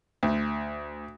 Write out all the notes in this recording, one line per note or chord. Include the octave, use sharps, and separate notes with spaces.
D2